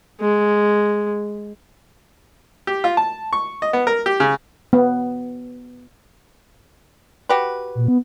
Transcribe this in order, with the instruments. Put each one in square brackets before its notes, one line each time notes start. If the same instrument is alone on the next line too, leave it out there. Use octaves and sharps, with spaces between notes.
[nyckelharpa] G#3
[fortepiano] G4
F4
A5
C#6
D#5
B3
A#4
G4
C#3
[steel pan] B3
[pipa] F#4 G4 B4
[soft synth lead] A#2
B3